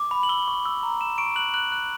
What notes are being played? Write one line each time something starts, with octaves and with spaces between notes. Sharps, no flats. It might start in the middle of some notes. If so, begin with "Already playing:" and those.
Already playing: D6
B5
F#7
E6 G7
C#6
E6
A#5
E6 E7
C#6 D7
F#6 F#7
F#6 F#7
F#6